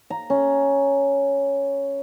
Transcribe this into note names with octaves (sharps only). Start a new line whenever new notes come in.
A#5
C#4